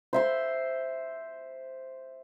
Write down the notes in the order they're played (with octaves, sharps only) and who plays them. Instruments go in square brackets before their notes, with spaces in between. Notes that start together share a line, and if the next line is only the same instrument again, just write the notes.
[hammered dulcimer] C5 E5 C6